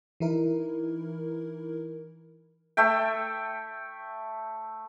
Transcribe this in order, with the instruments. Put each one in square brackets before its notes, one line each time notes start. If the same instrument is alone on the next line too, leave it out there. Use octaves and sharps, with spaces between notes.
[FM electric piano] E3 D#4 E4 A#4
[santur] A3 E5 G5